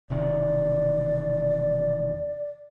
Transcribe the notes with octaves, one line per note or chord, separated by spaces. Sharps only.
E1 C3 D#3 D5